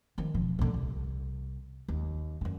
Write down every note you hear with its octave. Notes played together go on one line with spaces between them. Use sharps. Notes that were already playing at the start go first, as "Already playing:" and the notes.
D#3 F3
E1 F3
A#1 D3
C2
D#2
F#2 D3